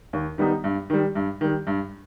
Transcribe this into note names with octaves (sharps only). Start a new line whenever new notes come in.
D#2
D#3 G3 B3 D#4
G2
D#3 G3
G2
D#3 G3
G2